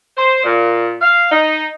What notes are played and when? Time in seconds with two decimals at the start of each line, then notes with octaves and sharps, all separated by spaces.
0.17 C5
0.43 A#2
1.01 F5
1.31 D#4